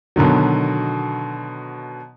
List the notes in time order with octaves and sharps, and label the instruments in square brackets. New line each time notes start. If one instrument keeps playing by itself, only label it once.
[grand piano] B2 D3 D#3 F#3